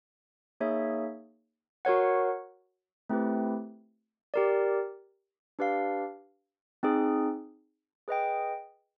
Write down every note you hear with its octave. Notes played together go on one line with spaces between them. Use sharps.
A#3 D#4 G#4 C#5 E5
F#4 A#4 C#5 F#5
A3 C4 E4 G4 B4
G4 A#4 D5
D4 G4 B4 D5 F5
C4 D#4 G#4
G#4 B4 D#5 G5